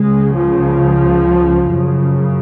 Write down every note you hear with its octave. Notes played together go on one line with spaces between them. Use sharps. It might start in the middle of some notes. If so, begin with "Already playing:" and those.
Already playing: C#2 C#3 G#3
F3
F#2 C#3